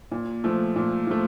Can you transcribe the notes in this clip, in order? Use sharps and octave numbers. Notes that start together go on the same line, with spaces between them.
A#2
F3 A3
A#2
F3 A3